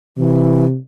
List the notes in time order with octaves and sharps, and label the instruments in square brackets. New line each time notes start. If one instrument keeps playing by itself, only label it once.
[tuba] C3 [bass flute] E3